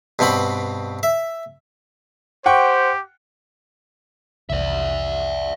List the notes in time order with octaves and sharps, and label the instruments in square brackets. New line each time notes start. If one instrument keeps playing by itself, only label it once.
[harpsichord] G2 B2 C4 B5
E5
[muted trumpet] G4 [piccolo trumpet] C5 [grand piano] F#5 G5 C#6
[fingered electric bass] F1 C2 E3 [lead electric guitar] D5 E5